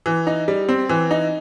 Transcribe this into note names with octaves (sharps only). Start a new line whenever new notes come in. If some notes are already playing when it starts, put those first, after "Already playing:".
E3
D#4
G3
C4
E3
D#4